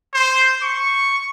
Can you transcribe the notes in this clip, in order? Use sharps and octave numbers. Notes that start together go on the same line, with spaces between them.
C5
C#6